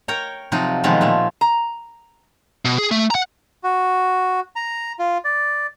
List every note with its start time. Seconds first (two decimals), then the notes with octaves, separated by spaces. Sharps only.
0.08 A#4 C#5 G5 A#5
0.52 C3 F3 F#3 D#4 F4
0.84 B2 D#3 F3 F#3 G#3 F4
1.01 A#2 A3 F4
1.41 A#5
2.65 B2
2.78 G#4
2.91 A3
3.10 F#5 A#5
3.64 F#4
4.56 A#5
4.99 F4
5.24 D5